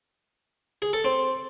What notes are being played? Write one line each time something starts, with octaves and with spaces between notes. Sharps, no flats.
G#4
A4
C4